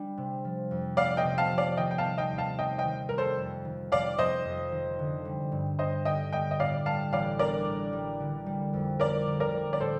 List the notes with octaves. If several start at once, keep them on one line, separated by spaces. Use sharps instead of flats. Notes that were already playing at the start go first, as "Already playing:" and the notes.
Already playing: G3 D4
C3
F3
F2
A3 D5 F5
D#5 G5
C3
F5 A5
F3
D5 F5
D#3 D#5 G5
G5
F5 A5
G3
D#5 G5
D#2
F5 A5
C4 D#5 G5
D#5 G5
D#3
G3 A#4
A4 C5
F2
D#3
F1 D5 F5
F1 C5 D#5
F2
D#3
D3
G3
G2
G2 C5 D#5
D3 D#5 G5
G3 D#5 G5
D#5
A2 D5 F5
G3 F5 A5
A1 D5 F5
D4 A#4 D5
A2
G3
D3
G3
F2
C4 A#4 D5
D3
A#4 D5
G3
D5
A2 A4 C5